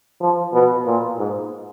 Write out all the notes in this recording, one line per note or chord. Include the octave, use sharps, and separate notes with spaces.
F3
B2
A#2
G#2